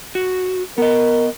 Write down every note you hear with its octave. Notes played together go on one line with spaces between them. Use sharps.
F#4
B3 A#4 D#5